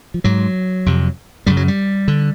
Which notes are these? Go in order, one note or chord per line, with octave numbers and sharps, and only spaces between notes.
F3
G#2 F#3
F2 C3
F#2 C#3 G3
F#3
G3
D3